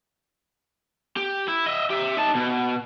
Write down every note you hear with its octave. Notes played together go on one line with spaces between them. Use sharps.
G4
E4
D#5 E5
G4 E5
D#4 A5
B2